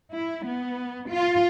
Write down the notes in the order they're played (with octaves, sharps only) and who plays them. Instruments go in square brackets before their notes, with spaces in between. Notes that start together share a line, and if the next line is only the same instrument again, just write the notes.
[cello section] E4
B3
F4